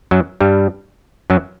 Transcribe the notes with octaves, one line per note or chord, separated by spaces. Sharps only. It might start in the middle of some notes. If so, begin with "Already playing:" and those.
F#2 F#3
G2 G3
F#2 F#3